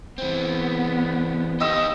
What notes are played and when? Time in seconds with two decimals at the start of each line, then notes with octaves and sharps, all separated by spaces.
0.18 E3 B3 C4
1.60 D#4 G4 D#5 E6